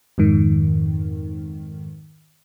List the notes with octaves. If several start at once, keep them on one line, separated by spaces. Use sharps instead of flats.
F2 G#2 D#3